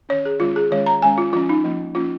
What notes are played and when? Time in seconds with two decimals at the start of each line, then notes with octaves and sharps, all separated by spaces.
0.09 D#3 C#4 C#5
0.25 G#4
0.40 D#3 G#3 C#4 F4
0.56 G#4
0.71 D#3 G#3 C#4 C#5
0.86 A#5
1.02 D#3 G#3 C#4 G#5
1.18 F4
1.33 F3 F4
1.36 C#4
1.49 D#4
1.64 F3 A#3 C#4
1.95 F3 A#3 C#4 F4